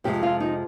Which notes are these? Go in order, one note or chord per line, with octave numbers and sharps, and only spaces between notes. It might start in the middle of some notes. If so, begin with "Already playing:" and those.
F2 C3 F3 G#3 G4
F4
D#4